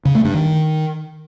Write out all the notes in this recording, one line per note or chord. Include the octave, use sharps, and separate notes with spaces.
C#3
A3
G2
D#3